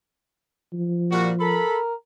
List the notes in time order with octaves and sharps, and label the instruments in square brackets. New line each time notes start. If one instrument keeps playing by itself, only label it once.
[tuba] F3
[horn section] A#2 G3 F#4
[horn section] A4 B5 [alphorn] A#4